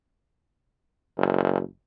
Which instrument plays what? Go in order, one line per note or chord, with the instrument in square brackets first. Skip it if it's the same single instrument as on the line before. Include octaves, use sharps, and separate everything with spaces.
[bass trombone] F#1